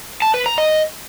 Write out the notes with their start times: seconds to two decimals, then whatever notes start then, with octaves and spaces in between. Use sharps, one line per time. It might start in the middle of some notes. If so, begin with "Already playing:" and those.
0.22 A5
0.34 B4
0.46 A#5
0.58 D#5